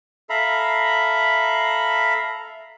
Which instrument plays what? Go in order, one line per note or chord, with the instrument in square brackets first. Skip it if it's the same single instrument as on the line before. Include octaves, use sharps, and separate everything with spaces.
[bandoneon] A4 E5 F5 A#5 B5